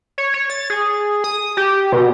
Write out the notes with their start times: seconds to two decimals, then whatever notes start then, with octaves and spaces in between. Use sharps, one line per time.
0.18 C#5
0.34 C#5
0.50 A6
0.70 G#4
1.24 D#6
1.57 G4
1.92 B2